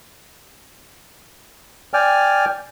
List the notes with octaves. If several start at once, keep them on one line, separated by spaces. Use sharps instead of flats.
D5 G5 G#5 F6